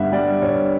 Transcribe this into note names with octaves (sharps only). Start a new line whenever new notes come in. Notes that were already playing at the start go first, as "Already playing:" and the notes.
Already playing: G2 D3 G3 B3 E5 F#5
G3 D5
G2 C#5